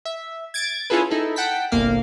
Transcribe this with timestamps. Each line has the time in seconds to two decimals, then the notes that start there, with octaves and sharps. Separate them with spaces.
0.05 E5
0.54 G#6 A6 D7
0.90 C#4 E4 F4 G#4 A4 B4
1.11 D#4 E4 A4
1.36 F#5 G5 A5 B6
1.72 G1 C2 A#3 F5